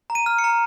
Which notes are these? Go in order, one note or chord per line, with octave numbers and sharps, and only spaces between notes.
A#5
D#7
F6
C#7
A#5